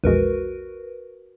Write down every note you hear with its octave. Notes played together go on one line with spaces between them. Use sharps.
A#1 E2 G#3 F#4 A#4 B4